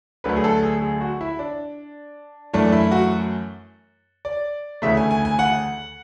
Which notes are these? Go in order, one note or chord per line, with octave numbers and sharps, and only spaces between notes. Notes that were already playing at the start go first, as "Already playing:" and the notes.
D2 D3 F#3 A3 B4
G#4
A4
G#4
G#4
F#4
E4
D4
F#2 E3 A3 D4
E4
F#4
D5
D2 C#3 E3 A3 E5
G#5
G#5
G#5
F#5